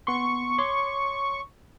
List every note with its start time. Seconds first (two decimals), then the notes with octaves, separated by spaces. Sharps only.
0.07 B3 C6 C#6
0.58 C#5 C6 D6